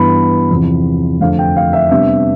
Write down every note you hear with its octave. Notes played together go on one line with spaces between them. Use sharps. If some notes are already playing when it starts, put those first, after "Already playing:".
Already playing: G2 E3 B3 D4 B5
E2 C3 F3
F2 D3 A3 C4 F5
G5
F5
E5
C3 G3 B3 D4 E5